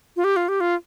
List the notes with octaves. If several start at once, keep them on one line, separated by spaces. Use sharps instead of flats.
F4
G4
F4
G4
F4